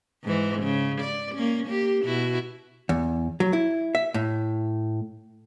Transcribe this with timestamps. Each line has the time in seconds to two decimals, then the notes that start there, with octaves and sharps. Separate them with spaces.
0.24 G#2 E3
0.63 C#3
1.01 D5
1.35 A#3 C#4
1.66 A#3 G4
2.04 B2 E4 F#4
2.89 E2
3.40 F#3
3.53 E4
3.95 E5
4.14 A2